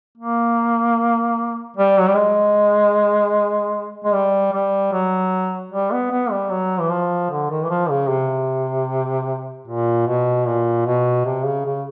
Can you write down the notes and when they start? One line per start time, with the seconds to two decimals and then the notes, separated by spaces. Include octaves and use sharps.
0.18 A#3
1.77 G3
2.00 F#3
2.08 G3
2.15 G#3
4.04 G#3
4.14 G3
4.53 G3
4.92 F#3
5.72 G3
5.92 B3
6.11 B3
6.31 G3
6.50 F#3
6.80 E3
6.90 F3
7.31 D3
7.50 D#3
7.63 E3
7.70 F3
7.90 C#3
8.09 C3
9.68 A#2
10.07 B2
10.46 A#2
10.86 B2
11.26 C3
11.46 C#3
11.66 C#3